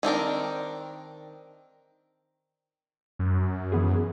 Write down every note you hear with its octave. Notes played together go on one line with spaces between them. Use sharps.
D#3 C4 D4 A#4
F#2
E3 B3 G#4